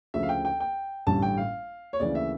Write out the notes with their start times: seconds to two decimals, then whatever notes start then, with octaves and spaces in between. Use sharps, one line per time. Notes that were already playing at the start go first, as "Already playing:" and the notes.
0.14 D2 C#3 F3 E5
0.23 F5
0.29 G5
0.45 G5
0.60 G5
1.07 A1 G2 D3 G3 C#4 A5
1.22 G5
1.37 F5
1.93 C#5
2.00 D2 C#3 E3 A#3 D5
2.15 E5